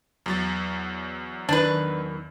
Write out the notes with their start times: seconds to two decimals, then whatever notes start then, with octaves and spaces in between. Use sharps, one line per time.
0.26 E2 F#3 A6
1.49 D#3 D4 B4